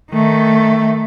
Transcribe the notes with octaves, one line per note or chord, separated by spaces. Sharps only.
D#3 A3